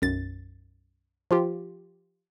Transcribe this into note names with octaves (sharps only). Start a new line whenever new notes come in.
B1 F#2 A6
F3 F4 G4